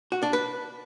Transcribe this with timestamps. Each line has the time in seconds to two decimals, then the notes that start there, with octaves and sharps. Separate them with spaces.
0.12 F#4
0.23 D4
0.33 B4